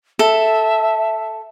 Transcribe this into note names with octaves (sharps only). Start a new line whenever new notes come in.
A4 E5